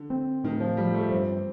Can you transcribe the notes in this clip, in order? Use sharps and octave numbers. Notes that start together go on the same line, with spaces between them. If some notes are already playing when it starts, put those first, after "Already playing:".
Already playing: D3
C4
A2 D#3
F3
F3 G3
A3
G2 C4